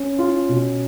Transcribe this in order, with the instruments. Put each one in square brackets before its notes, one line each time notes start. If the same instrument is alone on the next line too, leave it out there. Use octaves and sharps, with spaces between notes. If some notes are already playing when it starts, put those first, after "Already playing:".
Already playing: [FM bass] C#4
[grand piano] F4
B2